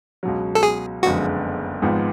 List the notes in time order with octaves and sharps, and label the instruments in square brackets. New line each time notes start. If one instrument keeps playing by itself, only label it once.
[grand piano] C#2 B2 F#3
[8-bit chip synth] A4
G#4
[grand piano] F#1 F2 D3 G#3 B3 [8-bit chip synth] F#4
[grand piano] G#1 G#2 F3 B3